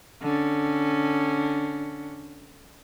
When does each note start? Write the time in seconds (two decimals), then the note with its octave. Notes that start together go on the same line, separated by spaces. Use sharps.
0.22 D3 C#4